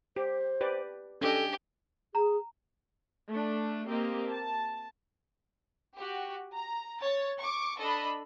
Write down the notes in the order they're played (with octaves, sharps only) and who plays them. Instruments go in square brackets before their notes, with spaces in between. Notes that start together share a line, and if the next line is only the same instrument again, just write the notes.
[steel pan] G4 [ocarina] C5
[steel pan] G4 B4 D5
[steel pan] C#4 D4 D#5 [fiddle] G4 [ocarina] A4
[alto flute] G#4 [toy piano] A#5
[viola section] A3 D4
A#3 C4 G4 D#5
A5
[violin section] F#4 G4
A#5
C#5 A6
C#6 D6
D4 A4 D#5 B5